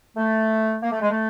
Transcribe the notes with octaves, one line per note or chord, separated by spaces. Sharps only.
A3
A#3
A3
G#3
A3